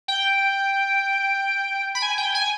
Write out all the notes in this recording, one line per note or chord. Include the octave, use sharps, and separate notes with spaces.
G5
B5
G#5
G5
G#5